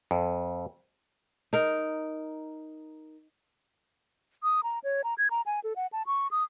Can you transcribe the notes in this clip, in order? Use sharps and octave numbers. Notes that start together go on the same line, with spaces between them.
F2
D#4 A#4
D#6
A#5
C#5
A#5
G#6
A#5
G#5
A4
F#5
A5
C#6
D#6